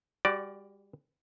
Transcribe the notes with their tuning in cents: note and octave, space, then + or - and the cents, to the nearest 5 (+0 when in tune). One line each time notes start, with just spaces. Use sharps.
G3 +35 F#4 +35 D5 +0